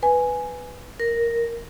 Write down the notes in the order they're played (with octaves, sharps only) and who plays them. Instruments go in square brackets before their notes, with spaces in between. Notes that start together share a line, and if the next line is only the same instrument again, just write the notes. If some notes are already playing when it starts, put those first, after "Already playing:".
[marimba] B4 G#5
[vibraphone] A#4